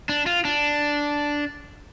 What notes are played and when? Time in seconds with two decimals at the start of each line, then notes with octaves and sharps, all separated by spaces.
0.09 D4
0.26 F4
0.45 D4